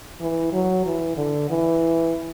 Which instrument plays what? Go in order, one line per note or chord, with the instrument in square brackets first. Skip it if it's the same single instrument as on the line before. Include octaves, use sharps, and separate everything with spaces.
[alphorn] E3
F#3
E3
D3
E3